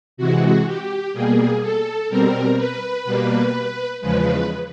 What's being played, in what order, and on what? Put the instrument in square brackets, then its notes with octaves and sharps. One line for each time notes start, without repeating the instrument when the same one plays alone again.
[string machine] C3 E3 G#3 F#4
G4
B2 G3 A#3 G#4
A4
B2 G3 C4 A#4
B4
B2 G3 A#3
E2 C#3 F3 G#3 B4